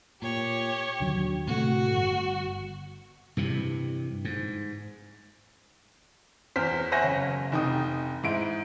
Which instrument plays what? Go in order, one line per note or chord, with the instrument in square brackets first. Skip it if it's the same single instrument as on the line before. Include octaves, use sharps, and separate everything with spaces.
[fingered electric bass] A#2 [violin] G4 C#5
[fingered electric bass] D#2 D3 F#3
[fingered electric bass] A2 C3 A3 [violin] F#4
[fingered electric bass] G1
[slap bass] G2 C3 E3
G#2
[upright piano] E2 C5 F6 B6
C5 C#5 E5 F#5 G#5 A#6
F#1
F1 D#4 G5 D#6
G#2 E4 D7